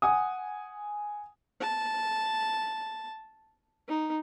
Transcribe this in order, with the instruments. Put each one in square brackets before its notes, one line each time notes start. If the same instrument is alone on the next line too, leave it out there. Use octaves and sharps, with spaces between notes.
[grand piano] F#5 G#5 D#6
[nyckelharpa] A5
D#4